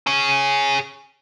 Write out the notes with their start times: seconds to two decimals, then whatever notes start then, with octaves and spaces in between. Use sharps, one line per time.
0.07 G#4 C#5